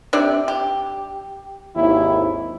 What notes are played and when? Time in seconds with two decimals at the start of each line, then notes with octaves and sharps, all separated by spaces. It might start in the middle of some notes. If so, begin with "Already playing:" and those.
0.13 C3 D4 D5
0.48 G4
1.76 G#1 D#2 E4